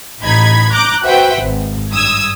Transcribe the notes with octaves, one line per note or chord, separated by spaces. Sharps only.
A1 D#4 B5 G#6
A#5 D6 F#6 G6
F#4 B4 C5 E5 F#5 G5
G#1
G2 D#6 E6 G#6